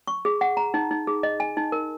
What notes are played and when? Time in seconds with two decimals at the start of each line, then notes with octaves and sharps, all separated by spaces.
0.07 C#6
0.25 G#4
0.41 F#5
0.57 A#5
0.74 D#4
0.91 D#4
1.07 G#4
1.23 D#5
1.40 G#5
1.57 D#4
1.72 A#4